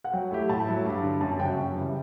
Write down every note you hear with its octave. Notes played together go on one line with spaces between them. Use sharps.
F#5
F#3 G5
A3 E4 G4
A2 A5
F#3 A3 E4
G2
D3 G3
F#2 A5
C#3 F#3 C#4 G5
F#2
C#3 E3 G3